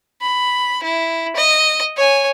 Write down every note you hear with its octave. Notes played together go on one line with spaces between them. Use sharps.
B5
E4
D#5
C#5 G#5